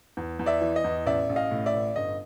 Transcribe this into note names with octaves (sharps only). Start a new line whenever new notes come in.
E2
E2
D5 E5
E3
D#5
E2
A1 D5 E5
A1
D#5 F5
A2
D5 E5
A1
G1 D#5